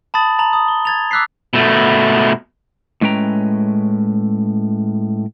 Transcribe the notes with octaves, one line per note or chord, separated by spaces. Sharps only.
A5 B5 D#6 A6 F#7
A5 A#5 E7 F#7
D#6
G7
G#6 A6 F7
D6 E6 F#6 B6 C7
B2 A3
A2 G#3 C#4 B4 G5 A#5